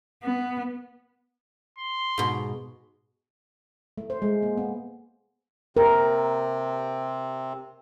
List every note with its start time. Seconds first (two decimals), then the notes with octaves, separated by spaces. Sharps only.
0.23 B3
1.78 C6
2.18 G#2 B2
3.98 A3
4.10 C5
4.22 G#3
4.43 A#3
4.57 B3
5.77 C3 C4 A#4